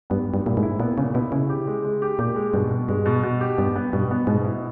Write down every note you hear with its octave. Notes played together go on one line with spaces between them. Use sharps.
G2 B3
G3
G2
A#2 E4
G#2
E4
A#2 B3
A#2 C#3
B2 E4
C#3 E4
G4
G#3
G#3
G4
A#2 G4
G#3
G2 B2
B2
G2 G#3
B2
B2
G4
G2 B3
B3
G2 B2
B3
G#2 B2
E4